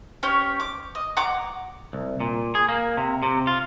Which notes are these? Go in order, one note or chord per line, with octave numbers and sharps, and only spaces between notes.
C#4 G4 C#5
D6
D#5
F#5 A#5 D6
C2
A#2
G#4
A#3
C3
C3
F4